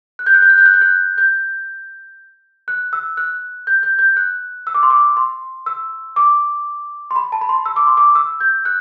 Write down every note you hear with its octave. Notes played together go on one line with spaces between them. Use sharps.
F#6
G6
F#6
G6
F#6
G6
F#6
G6
F#6
G6
F#6
E6
F#6
G6
G6
G6
F#6
E6
D6
C6
D6
C6
E6
D6
C6
B5
A5
B5
C6
E6
D6
C6
D6
E6
G6
F#6